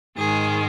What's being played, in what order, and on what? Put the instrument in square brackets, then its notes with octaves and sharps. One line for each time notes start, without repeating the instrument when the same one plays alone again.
[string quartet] G#2 D#3 G#3 G#4